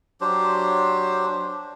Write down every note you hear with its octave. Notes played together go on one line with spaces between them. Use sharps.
F#3 D4 G4 C5